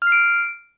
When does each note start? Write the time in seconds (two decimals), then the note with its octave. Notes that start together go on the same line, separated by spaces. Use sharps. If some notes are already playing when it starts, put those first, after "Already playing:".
0.02 F6
0.07 C7
0.12 D7